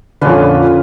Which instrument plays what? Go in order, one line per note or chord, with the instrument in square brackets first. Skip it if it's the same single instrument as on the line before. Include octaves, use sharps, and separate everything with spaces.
[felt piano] F2 A#2 D3 [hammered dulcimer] C#4 F4 B4